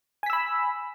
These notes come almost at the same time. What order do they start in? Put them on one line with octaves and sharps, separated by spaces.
G#5 B6 E6 B5